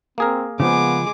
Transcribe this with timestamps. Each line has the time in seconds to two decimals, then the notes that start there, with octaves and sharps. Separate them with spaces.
0.18 A#3 C4 G#4 A#4
0.60 C#3 F3 G#3 B3 D6